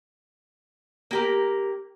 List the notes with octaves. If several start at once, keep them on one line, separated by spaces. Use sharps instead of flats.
A#3 G4 A#4